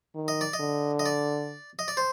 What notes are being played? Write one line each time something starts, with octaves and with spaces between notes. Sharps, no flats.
D#3
D#5
D5
D#5
D3
D#5
D5
D#5
D5
C5